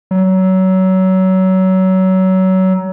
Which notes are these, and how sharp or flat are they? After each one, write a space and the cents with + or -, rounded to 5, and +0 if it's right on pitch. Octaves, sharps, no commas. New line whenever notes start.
F#3 +25